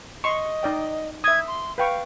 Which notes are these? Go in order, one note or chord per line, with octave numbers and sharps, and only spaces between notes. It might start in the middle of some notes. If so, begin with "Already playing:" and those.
D#5 C6 C#6
D#4 D5 G5
E5 D#6 G#6
C6
B4 F5 G5 C#6